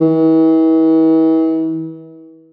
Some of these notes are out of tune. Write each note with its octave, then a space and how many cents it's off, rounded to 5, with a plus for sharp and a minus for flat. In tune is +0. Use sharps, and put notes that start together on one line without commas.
E3 -40